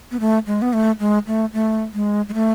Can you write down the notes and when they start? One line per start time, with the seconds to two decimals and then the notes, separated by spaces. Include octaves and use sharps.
0.11 B3
0.20 A3
0.47 G#3
0.62 B3
0.73 A3
1.00 G#3
1.27 A3
1.53 A3
1.94 G#3
2.29 G#3
2.34 A3